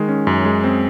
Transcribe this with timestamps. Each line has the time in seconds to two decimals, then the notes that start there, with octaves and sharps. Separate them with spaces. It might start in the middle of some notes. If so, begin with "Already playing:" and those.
Already playing: D#3 G#3
0.09 C#4
0.27 F#2
0.45 G#3
0.64 C4